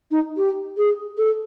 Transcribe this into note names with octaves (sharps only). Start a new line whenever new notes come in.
D#4
G4
G#4
A4